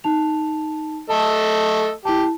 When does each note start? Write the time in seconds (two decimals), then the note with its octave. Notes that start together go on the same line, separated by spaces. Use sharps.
0.04 D#4 A5 F7
1.10 A3 A4 D#5 A5
2.05 E4 G4 A5